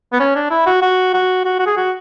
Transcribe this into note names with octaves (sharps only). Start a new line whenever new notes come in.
B3
C#4
D4
E4
F#4
F#4
F#4
F#4
F#4
G#4
F#4